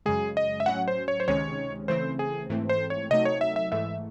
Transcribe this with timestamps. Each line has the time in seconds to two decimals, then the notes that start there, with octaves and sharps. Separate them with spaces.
0.06 F#2 C#3 G#3 G#4
0.37 D#5
0.60 E5
0.66 A2 F#3 C#4 F#5
0.88 C5
1.08 C#5
1.20 C5
1.28 C#2 C3 D#3 G#3 C#4 C#5
1.88 C#3 E3 A3 C4 C5
2.19 G#4
2.49 G#2 E3 A3 C4
2.69 C5
2.90 C#5
3.10 C3 F#3 A3 D#4 D#5
3.25 C#5
3.41 E5
3.56 E5
3.71 G#2 E3 A3 E5